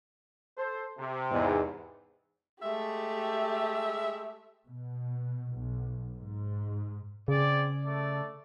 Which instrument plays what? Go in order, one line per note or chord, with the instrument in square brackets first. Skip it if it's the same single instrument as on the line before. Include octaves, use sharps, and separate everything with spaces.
[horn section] A4 C5
C3
[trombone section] E2 G#2
[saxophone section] G#3 E5 [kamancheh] A3 G4
[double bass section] B2
B1
G#2
[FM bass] C#3 [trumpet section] C4 G#4 D5
[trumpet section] A3 A4 D5